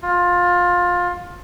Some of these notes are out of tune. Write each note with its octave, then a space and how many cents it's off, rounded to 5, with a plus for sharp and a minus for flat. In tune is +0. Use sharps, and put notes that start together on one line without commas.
F4 +20